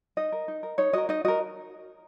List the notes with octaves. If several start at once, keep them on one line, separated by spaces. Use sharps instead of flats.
D#4 D#5
A#4
D#4
A#4
D#4 C#5
F#4 A#4 D#5
D#4 D#5
F#4 A#4 D#5